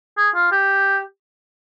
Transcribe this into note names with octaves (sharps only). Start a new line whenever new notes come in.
G#4
F4
G4